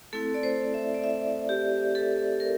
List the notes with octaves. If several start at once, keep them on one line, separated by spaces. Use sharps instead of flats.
A3 C4 E4 A4
D5
C5
E5
D5
E5
G4
A4
A#4